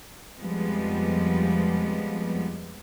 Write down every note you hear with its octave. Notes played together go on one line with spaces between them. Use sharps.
F2 F3 G3 G#3 B3